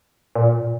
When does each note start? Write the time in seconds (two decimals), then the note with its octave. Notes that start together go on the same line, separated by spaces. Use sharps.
0.35 A#2